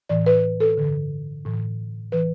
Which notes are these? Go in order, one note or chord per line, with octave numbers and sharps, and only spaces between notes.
A2 E3 D5
B4
A4
G2 D3
A2 E3
E3 B4